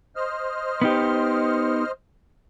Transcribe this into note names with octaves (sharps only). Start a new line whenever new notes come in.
C5 D#5 F6
B3 D#4 G4